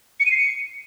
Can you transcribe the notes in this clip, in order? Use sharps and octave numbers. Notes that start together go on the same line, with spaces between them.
C#7
D#7
C7
C#7